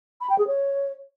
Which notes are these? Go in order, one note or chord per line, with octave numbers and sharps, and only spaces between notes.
B5
G5
G#4
C#5